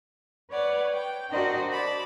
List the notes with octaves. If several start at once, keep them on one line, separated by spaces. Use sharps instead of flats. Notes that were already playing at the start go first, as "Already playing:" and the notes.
B4 C#5 D5 F#5
G5
D4 F#4 A#4 C5 D5 D#5
D5 A5 B5